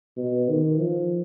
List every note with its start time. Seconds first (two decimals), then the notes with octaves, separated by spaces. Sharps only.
0.17 B2
0.49 D#3
0.79 F3